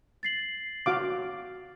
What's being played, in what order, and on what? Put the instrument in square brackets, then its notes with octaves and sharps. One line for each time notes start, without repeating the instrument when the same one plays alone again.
[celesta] A6 C7 F#7
[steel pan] F#4 F5 D6